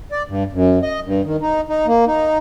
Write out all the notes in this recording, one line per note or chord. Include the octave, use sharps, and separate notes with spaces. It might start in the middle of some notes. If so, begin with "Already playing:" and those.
D5
G2
F#2
D#5
G2
D#3
D#4
D#4
A#3
D#4